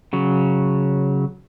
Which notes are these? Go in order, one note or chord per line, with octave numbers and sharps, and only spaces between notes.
C#3 F#3